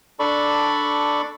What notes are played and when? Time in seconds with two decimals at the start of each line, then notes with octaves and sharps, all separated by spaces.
0.20 D4 A4 D5 B5 C#6